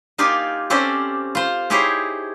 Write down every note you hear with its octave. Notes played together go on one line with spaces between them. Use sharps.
A#3 D#4 F4 G4 D5 G#5
C4 C#4 G4 A4 C5 D5
F4 C5
D#4 E4 G4 G#4 C5 C#5